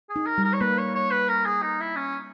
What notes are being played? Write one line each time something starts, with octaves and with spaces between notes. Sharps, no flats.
G#4
D#4
A#4
G3
A#4
C#5
A#3 B4
C#5
C#5
B4
A#4
G#4
D#4
E4
C#4